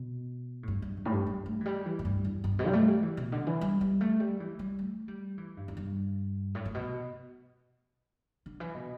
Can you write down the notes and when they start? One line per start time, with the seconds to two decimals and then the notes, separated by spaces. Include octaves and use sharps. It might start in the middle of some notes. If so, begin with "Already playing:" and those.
Already playing: B2
0.63 A2
0.68 G2
0.82 G2
0.97 E2
1.05 A2
1.12 G2
1.27 G2
1.46 A3
1.61 E3
1.66 G3
1.85 E3
1.99 A2
2.05 G2
2.24 E2
2.44 G2
2.59 B2
2.67 G3
2.73 A3
2.88 G3
3.03 E3
3.17 B2
3.32 D3
3.47 E3
3.61 G3
3.81 G3
4.01 A3
4.20 G3
4.40 E3
4.59 G3
4.79 A3
5.08 G3
5.38 E3
5.57 G2
5.68 E2
5.77 G2
6.55 A2
6.65 A2
6.74 B2
8.46 D3
8.60 E3
8.75 B2